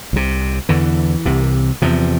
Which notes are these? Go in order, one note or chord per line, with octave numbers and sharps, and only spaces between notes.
C2 C3
E2 D3 E3
C2 C3
E2 C3 F3